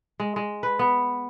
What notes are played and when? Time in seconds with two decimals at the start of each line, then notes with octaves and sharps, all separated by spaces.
0.20 G#3
0.36 G#3
0.63 B4
0.79 B3